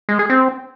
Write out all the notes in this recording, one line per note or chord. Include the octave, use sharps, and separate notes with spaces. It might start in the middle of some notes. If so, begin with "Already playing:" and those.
G#3
G#4
C4